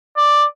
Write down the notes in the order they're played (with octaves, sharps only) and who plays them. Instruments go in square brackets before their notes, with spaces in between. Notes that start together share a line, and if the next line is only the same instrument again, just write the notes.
[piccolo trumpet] D5